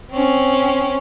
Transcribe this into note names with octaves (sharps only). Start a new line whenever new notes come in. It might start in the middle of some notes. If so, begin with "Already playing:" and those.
C4 C#4